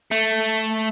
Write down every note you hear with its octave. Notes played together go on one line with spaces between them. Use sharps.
A3